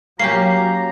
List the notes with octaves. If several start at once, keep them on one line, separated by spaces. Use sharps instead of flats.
F#3 A#3 C#4 G4 A#5 C7